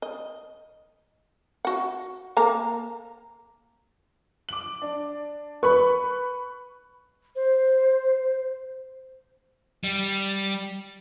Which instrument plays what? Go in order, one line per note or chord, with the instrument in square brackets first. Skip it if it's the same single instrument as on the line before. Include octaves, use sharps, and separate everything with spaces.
[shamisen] D#5
F#4 F#5
A#3 A4 A#5
[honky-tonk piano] D6 F#7
D4
[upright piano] B4 [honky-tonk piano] B5 C#6
[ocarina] C5
[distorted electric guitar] G3